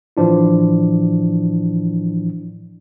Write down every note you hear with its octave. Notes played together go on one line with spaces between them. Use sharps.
A2 E3 F3 D4 E4